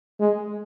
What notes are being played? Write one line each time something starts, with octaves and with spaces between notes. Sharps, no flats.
G#3